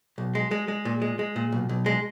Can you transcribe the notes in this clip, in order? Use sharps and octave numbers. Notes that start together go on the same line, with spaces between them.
B1
G#3
G#3
G#3
A#2
G#3
G#3
A#2
B1
B1
G#3